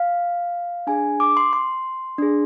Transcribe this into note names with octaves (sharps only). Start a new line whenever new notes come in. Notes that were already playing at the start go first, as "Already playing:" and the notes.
Already playing: F5
D4 G#4 G#5
D6
C6
C6
D4 G#4